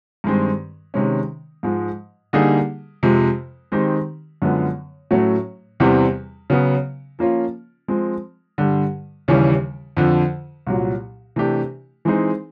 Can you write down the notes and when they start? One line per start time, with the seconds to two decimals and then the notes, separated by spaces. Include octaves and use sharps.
0.24 G2 D#3 G#3 C4
0.94 C3 D#3 G#3 C#4
1.63 G#2 F3 G#3
2.33 D3 G3 A#3 D#4 G#4
3.03 F2 C3 F3 G#3
3.72 D#3 G#3 C4 D#4 G4
4.42 F#2 D3 F3 G#3 B3
5.11 A2 F#3 A3 C#4 F#4
5.80 E2 C3 E3 G3 C4
6.50 C#3 F#3 B3
7.19 F3 A#3 C#4 F4
7.88 F3 G#3 C4
8.58 G2 D3 G3
9.28 D#2 C#3 E3 G3
9.97 F2 D3 F3
10.67 C2 A#2 F#3
11.36 C3 E3 A3 D4 G4
12.05 E3 G#3 C4 D#4 G#4